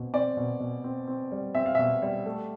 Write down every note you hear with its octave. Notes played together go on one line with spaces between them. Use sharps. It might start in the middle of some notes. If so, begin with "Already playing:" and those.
Already playing: B2 C4
C4 D5
B2
B2
C4
C4
G3
C4 E5
F5
B2 E5
G3
A3